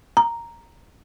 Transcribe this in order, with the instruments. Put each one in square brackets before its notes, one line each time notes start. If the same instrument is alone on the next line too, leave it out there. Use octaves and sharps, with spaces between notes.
[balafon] A#5